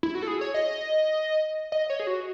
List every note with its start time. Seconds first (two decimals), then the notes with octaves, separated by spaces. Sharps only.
0.03 E4
0.15 F#4
0.22 A4
0.27 G#4
0.41 C#5
0.54 D#5
1.72 D#5
1.90 C#5
2.00 G#4
2.07 F#4